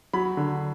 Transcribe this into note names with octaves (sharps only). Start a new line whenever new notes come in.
F#3 B5
D3